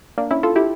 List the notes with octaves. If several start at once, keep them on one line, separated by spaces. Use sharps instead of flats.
A#3 D4
C#4 E4
F4 A4
E4 G4